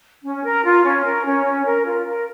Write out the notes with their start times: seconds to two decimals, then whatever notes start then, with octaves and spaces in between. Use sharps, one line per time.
0.23 C#4
0.44 A#4
0.64 F4
0.84 C#4
1.04 A#4
1.25 C#4
1.45 C#4
1.65 A#4
1.85 F4
2.06 A#4